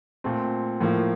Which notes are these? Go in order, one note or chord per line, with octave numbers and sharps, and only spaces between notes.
A#2 A3 C4
A2 F3 A#3